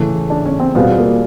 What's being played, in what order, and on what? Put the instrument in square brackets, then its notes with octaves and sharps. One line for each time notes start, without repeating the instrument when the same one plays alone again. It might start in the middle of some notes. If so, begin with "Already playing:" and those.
Already playing: [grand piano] C#3 E3 A3
[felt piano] D4
C#4
C4
[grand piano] B2 G3 C4 F4 G#4 [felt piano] B3
[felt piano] A#3